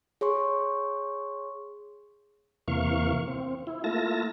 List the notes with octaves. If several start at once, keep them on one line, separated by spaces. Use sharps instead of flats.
G#4 C#5 C6 C#6
E2 C3 E3 A#3 F5 C#6
C4
E4
A3 A#3 E4 F4 A5 A#6